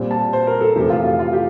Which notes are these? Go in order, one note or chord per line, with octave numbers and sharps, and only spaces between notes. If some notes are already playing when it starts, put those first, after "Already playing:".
Already playing: A#2 G3 C4
A5
C5
A#4
A4
F2 C3 E3 A3 C4 G4
F4
F4
F4
G4